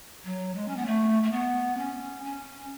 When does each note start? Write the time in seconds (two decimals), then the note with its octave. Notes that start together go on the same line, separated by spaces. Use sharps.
0.24 F#3
0.55 G#3
0.68 C#4
0.76 B3
0.86 A3
1.23 A3
1.31 B3
1.77 C#4
2.24 C#4